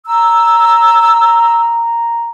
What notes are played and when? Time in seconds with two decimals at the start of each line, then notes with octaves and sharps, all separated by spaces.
0.07 A#5 E6